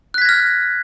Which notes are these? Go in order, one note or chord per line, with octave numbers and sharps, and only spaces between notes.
F6 F#6 G#6 A#6 B6